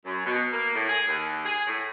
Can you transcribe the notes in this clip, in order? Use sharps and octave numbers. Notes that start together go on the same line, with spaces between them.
F#2
B2
A#3
A2
G#4
D#2
G#4
A2